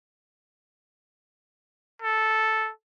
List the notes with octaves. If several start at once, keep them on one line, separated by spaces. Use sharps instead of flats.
A4